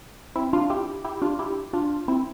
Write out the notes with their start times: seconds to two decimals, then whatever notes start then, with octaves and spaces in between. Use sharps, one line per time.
0.36 C4 E4
0.53 D4 F4
0.70 E4 G4
1.04 E4 G4
1.22 D4 F4
1.39 E4 G4
1.73 D4 F4
2.08 C4 E4